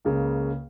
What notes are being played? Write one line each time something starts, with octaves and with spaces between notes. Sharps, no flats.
C#2 C#3 A#3